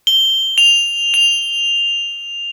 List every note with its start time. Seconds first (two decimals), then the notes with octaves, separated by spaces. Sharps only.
0.07 G7
0.58 F7
1.14 F7